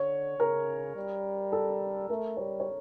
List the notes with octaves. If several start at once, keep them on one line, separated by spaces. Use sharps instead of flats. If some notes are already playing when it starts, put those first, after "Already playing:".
Already playing: D3 C#5
C#3 A#4
G3
A4
A3 A#4
G3 C#5
C#5